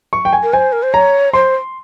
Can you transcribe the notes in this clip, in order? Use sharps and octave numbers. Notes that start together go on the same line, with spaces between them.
C#6
G5
G#5
A#4
C5 G#5
A#4
C5
C#5 A#5
C5 C6